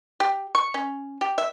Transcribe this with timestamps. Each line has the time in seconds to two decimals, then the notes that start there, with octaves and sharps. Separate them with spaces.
0.20 G4
0.55 C#6
0.74 C#4
1.21 G4
1.38 E5